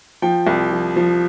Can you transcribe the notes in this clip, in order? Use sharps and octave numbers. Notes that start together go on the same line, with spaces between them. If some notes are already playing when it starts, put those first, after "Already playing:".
F3 G5
C2
F3
F3